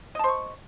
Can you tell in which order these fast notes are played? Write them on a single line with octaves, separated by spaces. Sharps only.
D#5 A5 C5 C#6